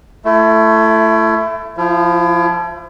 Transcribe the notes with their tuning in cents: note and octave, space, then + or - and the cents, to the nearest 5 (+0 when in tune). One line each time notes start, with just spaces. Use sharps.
A3 +5 E4 +30
F3 +0 E4 +35